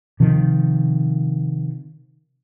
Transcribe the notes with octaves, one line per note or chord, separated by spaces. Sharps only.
C3 D#3 F3